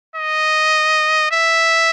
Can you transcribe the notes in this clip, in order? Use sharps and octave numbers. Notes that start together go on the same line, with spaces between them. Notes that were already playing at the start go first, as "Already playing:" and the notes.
D#5
E5